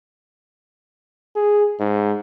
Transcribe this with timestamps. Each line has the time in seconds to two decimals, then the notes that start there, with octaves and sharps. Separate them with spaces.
1.36 G#4
1.79 G#2